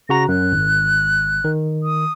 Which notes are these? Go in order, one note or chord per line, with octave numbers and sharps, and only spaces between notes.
C#3 F#4 A#5 A#6
F#2 F#6
G#1
D#3
D#6